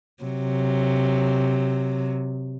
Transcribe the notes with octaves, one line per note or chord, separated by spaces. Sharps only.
C3 F#3